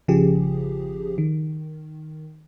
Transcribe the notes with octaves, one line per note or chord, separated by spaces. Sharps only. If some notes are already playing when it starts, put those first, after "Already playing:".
G#1 C#3 F3 G4 G#4
D#3